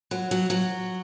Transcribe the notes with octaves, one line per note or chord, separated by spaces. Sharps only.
F#3
F#3
F#3